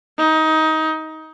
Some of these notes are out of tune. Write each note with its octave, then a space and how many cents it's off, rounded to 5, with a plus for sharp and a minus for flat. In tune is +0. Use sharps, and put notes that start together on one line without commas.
D#4 +20